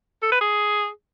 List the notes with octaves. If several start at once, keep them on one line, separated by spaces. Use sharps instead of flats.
A4
B4
G#4